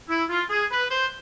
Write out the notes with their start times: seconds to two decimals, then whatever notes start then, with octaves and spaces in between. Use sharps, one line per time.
0.09 E4
0.29 F4
0.50 G#4
0.71 B4
0.91 C5